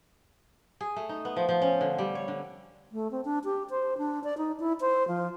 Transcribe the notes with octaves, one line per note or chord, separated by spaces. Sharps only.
G#4
A3
D#4
B3
F3
F3
C#4
D3
G3
C#5
D3
A3
C4
D4
G4
C5
D4
D5
D#4
E4
C5
F3